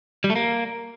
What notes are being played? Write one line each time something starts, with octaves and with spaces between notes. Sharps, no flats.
G3
A3
A#3